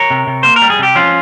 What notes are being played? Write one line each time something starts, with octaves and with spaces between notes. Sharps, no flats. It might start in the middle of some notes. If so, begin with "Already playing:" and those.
Already playing: A#4 C#5
C3
C3
A#3 C5
A#4
G3
G#4
C3 G4
F3 C#4 F4